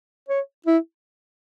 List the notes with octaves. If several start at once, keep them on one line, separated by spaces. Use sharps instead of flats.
C#5
E4